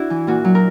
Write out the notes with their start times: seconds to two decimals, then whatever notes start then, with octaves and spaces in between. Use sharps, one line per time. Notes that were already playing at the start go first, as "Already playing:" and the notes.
Already playing: D4 E4 F#4
0.10 E3
0.27 A#2 F#4
0.45 F#3
0.55 A#4